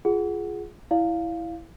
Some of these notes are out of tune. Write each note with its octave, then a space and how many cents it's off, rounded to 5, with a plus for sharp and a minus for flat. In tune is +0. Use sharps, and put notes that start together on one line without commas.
F4 +0 G#4 +0 F#5 +0
E4 +0 D5 +0 F5 +0